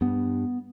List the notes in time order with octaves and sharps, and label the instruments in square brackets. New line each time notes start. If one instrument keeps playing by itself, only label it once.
[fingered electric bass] G2 B3